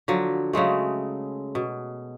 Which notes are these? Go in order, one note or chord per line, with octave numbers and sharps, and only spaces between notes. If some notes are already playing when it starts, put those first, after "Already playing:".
D3 F3 F#3
C#3 F#3 G#3 A3
B2